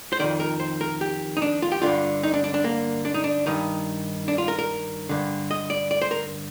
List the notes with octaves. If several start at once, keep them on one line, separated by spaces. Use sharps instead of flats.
C5
F2 C3 D#3 D5
A#4
C5
A#4
G4
D#4
D4
F4
G4
G2 D3 F4
D#4
D4
D4
D4
A#3
D4
D#4
D4
G2 D#3 D#4
D4
F4
A#4
A#4
G2 D3
D#5
D5
D5
C5
A#4